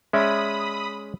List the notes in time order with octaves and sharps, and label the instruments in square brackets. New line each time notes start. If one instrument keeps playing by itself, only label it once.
[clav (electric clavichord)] G#3 C#4 D5 [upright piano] E5 [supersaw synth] B5 D#6